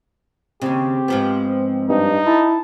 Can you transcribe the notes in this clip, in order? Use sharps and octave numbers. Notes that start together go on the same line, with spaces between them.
D#2 C#3 C4 G4
G#2 F3 B3
G2 D#4
E4 A5